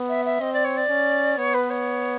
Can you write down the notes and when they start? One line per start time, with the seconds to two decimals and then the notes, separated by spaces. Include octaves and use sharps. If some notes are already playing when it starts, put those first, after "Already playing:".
Already playing: B3
0.09 E5
0.25 E5
0.41 C4 D#5
0.53 D5
0.64 C#5
0.77 D5
0.90 C#4
1.38 B3 C#5
1.54 B4
1.70 C#5